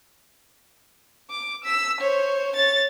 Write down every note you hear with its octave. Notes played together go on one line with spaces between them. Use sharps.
D6
E6 B6
C5 C#5
C#5 A6